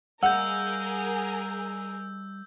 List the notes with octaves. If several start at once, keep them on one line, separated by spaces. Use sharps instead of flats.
G3 G#4 A#4 D#5 F5 F#5 E6 G6